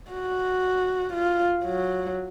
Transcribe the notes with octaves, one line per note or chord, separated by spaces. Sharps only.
F#4
F4
F#3